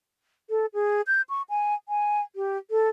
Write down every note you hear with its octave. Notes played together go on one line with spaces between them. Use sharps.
A4
G#4
G6
C#6
G#5
G#5
G4
A4